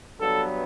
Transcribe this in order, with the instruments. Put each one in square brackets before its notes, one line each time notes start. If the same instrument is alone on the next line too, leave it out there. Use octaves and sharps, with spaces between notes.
[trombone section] G2 F#3 B3 A4